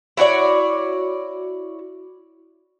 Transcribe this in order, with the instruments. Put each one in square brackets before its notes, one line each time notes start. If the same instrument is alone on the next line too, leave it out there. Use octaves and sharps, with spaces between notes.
[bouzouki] E4 F#4 C#5 D5